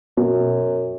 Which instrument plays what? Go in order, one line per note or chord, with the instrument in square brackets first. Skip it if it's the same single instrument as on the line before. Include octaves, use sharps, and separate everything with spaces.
[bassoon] F#2 [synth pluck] B2